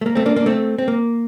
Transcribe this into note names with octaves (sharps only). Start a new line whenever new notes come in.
A3
A#3
A3 C4
A#3 D4
A#3 D4
A3 C4
C4
A#3